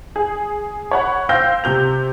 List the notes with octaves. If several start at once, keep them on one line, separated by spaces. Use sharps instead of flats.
G#4
C#5 F#5 B5
C5 F5 G5 E6 G6 A#6
C3 G6 F7